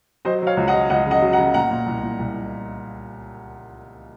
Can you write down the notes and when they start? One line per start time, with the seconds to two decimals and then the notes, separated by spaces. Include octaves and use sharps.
0.25 F#3 C5 D#5
0.42 F#3 C#5 F5
0.57 C#2
0.68 D#5 F#5
0.73 F#3
0.90 C#2 D#5 F#5
1.06 C#3 D#5 F#5
1.21 F#3
1.32 F#5 A#5
1.38 C#3
1.54 A#2 F#5 A#5
1.71 A#2
1.86 C2
2.02 A#2
2.19 C2